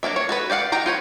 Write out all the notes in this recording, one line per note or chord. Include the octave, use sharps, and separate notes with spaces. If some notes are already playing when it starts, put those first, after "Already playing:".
F#3 A#3 D4 E5
C#5
F#4 A4 B4
G4 D5 F5 F#5
E3 D#4 G4 G5 A#5
F4 B4 C#5